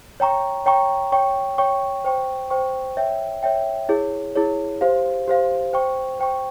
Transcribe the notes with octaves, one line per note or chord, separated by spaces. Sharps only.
C#5 G5 A#5 C#6
C#5 G5 A#5 C#6
C#5 G5 C#6
C#5 G5 C#6
C5 G5 C#6
C5 G5 C#6
C#5 E5 G5
C#5 E5 G5
E4 G#4 C#5
E4 G#4 C#5
G4 C5 F5
G4 C5 F5
C5 G5 C#6
C5 G5 C#6